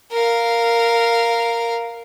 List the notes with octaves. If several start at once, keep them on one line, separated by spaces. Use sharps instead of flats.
A#4 F5